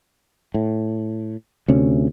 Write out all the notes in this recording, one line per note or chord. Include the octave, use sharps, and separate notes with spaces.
A2
D2 C3 C#4